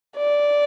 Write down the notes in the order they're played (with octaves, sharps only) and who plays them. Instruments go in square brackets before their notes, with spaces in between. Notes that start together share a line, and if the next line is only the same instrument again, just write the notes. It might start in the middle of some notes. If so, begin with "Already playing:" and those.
[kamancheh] D5